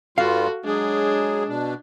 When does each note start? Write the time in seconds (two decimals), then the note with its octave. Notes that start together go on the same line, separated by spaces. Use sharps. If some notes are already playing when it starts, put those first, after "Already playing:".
0.18 G2 G3 F4 F#4 A4 F5
0.65 F#3 G#3 D4 G#4
1.48 B2 D4